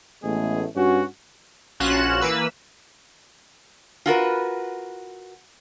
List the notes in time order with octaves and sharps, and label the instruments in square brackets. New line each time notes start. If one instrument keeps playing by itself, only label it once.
[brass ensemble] A1 G#3 A3 B3 G#4
G2 C#4 F#4
[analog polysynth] A#1 C#4 F4 F#4 F#6 E7
E3 A#3 B4 E6
[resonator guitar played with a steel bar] F4 F#4 A#4 B4